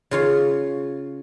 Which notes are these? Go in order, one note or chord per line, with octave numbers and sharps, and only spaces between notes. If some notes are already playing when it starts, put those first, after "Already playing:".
C#3 F4 C#5